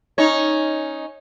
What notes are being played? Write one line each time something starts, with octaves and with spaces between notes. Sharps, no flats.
C#4 D#4 C#5